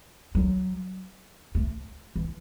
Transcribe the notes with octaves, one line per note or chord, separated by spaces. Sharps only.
F#3
A3
E3